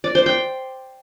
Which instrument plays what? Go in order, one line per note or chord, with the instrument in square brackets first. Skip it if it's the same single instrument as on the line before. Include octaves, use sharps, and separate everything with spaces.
[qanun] D5
C5
G5